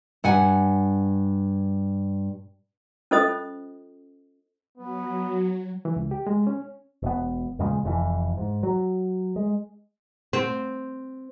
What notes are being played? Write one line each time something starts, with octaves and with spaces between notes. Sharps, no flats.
G2 F#5 G#5
C#4 F4 A4 C5 D#5 D#6
F#3 B3
E3
C#2
G4
G#3
C#4
E1 B3
E2 A#2 C#3 G#3
F1 F2 G#2 E3
G#2
F#3
G#3
C4